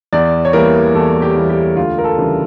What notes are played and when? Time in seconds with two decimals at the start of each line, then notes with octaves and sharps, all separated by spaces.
0.13 E2 D5
0.45 C#5
0.53 E3 G3 A#3 A#4
0.94 E2 A4
1.22 G4
1.36 E3 G3 A#3
1.50 G4
1.76 D2 F4
1.98 A#4
2.04 A4
2.18 C#3 E3 G3 D4